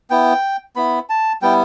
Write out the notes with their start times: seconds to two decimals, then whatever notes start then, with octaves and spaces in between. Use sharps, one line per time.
0.10 B3 E4 G5
0.76 B3 E4 B5
1.09 A5
1.42 G3 B3 E4 G5